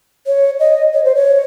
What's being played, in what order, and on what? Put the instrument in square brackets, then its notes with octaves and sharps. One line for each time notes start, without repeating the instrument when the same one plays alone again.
[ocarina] C#5
D#5
C#5
C5
C#5